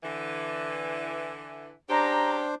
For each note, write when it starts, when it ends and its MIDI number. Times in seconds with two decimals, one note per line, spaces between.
0.03 1.72 50
0.03 1.72 52
1.89 2.47 49
1.89 2.47 61
1.89 2.55 62
1.89 2.47 67
1.89 2.55 72
1.89 2.34 82